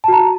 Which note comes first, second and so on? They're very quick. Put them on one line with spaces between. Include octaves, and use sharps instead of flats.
A5 F#4 A#5